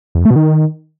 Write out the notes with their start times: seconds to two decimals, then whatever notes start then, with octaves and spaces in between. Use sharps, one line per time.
0.15 E2
0.20 F2
0.25 A3
0.31 B2
0.36 D#3